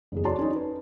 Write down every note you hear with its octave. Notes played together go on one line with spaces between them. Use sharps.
F#1 E2 G#4
F#4 A4 C#5 D5 A5 C6
C#4 D#4
B4